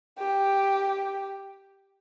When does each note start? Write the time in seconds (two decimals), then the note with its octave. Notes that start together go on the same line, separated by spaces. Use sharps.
0.19 G4